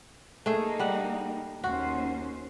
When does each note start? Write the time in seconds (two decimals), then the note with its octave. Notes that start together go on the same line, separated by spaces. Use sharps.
0.46 A3 A#3 D#4 G#4
0.79 G3 F#5
1.64 D#2 C#4 F#4 C5